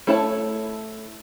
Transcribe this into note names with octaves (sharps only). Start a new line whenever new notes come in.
A3 E4 A4 C#5 A5